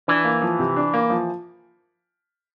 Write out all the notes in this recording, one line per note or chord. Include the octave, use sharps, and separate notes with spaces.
E3 D4
A#3
F3
C3
D4
A#3
F3